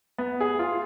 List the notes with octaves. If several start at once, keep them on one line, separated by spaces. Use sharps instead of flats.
B3
G#4
F4